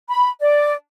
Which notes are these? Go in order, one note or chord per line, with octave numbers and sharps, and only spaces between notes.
B5
D5